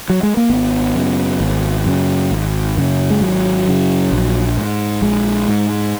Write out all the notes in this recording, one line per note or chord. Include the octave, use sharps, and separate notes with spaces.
F#3
G#3
A#3
G#1 B3
F#2 C#3
G#1
F#2 C#3
G#1
F#2 C#3
G#3
G#1 F#3
F#2 C#3
A#1
G#2
A#1 G#3
G#2